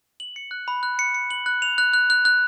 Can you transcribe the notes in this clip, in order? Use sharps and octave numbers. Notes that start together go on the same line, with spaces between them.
F#7
C#7
F#6
B5
F#6
C#7
C#7
F#7
F#6
F7
F#6
F#6
F#6
F#6